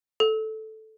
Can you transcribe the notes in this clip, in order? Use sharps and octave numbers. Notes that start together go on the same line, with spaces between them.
A4